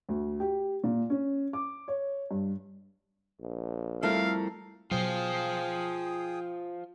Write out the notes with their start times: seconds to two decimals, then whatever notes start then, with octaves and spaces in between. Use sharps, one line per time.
0.09 D2
0.40 G4
0.84 A#2
1.10 C#4
1.53 D6
1.88 C#5
2.31 G2
3.40 A#1
4.03 F2 G3 A3 E4 A4 A#4 F5
4.91 B2 F#3 F4 G#4 C5 G5 D#6